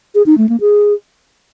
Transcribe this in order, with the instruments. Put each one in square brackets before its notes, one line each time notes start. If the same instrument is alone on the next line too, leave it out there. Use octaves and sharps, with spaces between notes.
[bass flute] G#4
D#4
A3
A#3
G#4